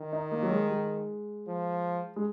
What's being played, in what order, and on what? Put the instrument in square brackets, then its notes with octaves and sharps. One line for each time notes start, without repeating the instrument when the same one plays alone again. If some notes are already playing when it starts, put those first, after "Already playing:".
Already playing: [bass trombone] D#3
[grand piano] D#4
A#3
F#3
G#3
G#3
[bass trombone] F3
[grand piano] G#3